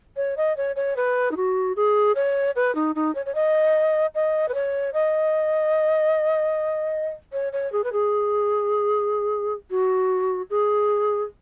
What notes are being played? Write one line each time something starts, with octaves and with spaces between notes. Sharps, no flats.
C#5
D#5
C#5
C#5
B4
D#4
F#4
G#4
C#5
B4
D#4
D#4
C#5
C#5
D#5
D#5
B4
C#5
D#5
C#5
C#5
G#4
B4
G#4
F#4
G#4